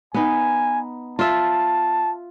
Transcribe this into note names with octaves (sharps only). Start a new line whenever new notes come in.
B3 D#4 G#5
F4 E5 A5